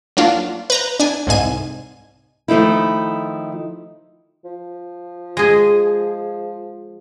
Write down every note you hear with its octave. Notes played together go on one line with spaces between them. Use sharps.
F#3 A#3 D4 F4
B4 A#5 G6
D4 G#5
C2 G#2 G#4 G#5 D#7
D#3 F3 A3 D#4 E4
F3
G#3 G#4